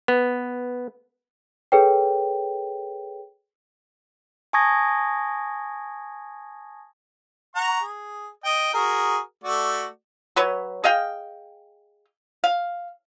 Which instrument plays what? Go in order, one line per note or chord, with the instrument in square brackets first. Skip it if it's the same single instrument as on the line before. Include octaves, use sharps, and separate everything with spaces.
[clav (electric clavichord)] B3
[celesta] G#4 A4 B4 C#5 G5
[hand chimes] G#5 A5 C#6 D#6 G#6 A#6
[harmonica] F#5 A#5 C#6
G#4
D#5 G5
F#4 G#4 A#4
A3 F#4 D5
[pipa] F#3 B4 C#5
G#4 D#5 F5 G5
F5